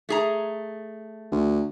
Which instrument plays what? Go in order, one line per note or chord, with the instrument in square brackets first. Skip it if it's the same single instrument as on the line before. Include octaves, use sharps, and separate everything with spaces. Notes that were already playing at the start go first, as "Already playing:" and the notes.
[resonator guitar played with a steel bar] A3 G#4 A#5
[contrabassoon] D2